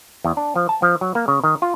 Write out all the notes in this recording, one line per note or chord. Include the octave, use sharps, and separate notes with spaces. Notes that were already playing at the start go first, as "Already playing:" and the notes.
E2
D4
F3
A5
F3
F#3
A#3
C#3
D#3
F4